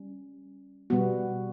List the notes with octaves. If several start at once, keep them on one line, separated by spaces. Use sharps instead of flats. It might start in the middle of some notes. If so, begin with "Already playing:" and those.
Already playing: G3 C#4
B2 G3 B3 F#4